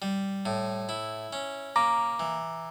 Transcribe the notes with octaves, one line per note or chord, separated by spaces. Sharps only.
G3
A2
E4
C#4
A#3 A#5 D6
E3